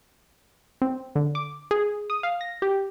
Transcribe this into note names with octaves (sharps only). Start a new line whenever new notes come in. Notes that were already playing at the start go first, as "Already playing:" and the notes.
C4
D3
D6
G#4
D#6
F5
A#6
G4